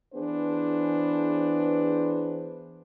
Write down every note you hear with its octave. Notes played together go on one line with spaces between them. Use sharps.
E3 B3 D4 G#4 B4 C5